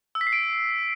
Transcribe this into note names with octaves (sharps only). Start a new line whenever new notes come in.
E6
B6
C7
D7